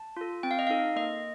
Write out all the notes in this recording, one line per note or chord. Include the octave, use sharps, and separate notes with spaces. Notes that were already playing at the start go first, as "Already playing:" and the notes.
Already playing: A5
F4 A4
C4 G5
F5
D#5
D#4 A4 F5
A#3 D#5